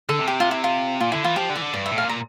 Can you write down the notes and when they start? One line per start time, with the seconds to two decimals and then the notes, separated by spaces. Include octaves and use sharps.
0.09 D3 A4
0.19 C3
0.28 G4
0.40 F4
0.51 E4
0.64 F4
1.00 A#2 F4
1.12 D3 E4
1.24 E3 F4
1.36 F3 G4
1.49 D3
1.55 E3 D5
1.61 D3
1.73 G2 D5
1.86 E5
1.92 A2
1.98 F5
2.04 A#2
2.09 A#5